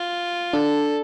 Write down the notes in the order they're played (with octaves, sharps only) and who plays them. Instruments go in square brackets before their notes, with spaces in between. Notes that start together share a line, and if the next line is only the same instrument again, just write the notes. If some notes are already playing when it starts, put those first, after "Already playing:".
Already playing: [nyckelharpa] F4
[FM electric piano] D4 [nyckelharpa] A4